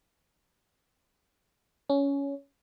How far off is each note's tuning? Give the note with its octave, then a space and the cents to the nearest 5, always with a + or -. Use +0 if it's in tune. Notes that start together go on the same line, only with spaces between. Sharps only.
C#4 +15